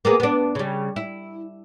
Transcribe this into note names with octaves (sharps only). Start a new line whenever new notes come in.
A#3 B3 G#4
B3 D4
C#3 G3
E4